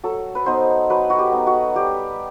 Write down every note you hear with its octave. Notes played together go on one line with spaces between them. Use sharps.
F#3 A4
B4
B3 D#4 C5
F#3 B4
F#4
G4
B3 D#4
F#4
G3 G4